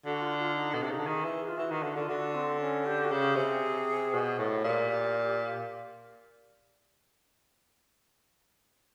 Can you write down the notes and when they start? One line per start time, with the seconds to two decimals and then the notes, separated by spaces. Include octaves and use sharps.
0.05 D3 F#4
0.21 F4
0.39 F4
0.55 D#4
0.73 B2 D4
0.82 C3
0.90 C#3 D#4
0.98 D3
1.07 D#3 G#4
1.24 E3
1.48 F4
1.58 E3 F#4
1.71 D#3
1.83 D3
1.96 D3 F4
2.09 D3 F#4
2.35 C4
2.61 C#4
2.86 G4
3.05 F#4
3.11 C#3 G4
3.36 C3 G#4
4.14 B2
4.39 A2
4.64 A#2 G4